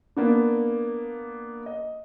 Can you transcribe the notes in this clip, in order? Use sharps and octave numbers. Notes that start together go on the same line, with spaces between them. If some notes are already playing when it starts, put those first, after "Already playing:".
A#3 B3 D4
D#5